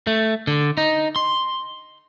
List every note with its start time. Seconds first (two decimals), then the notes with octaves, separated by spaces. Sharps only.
0.07 A3
0.47 D3
0.77 D#4
1.16 C6